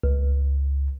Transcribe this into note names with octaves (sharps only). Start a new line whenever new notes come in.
C#2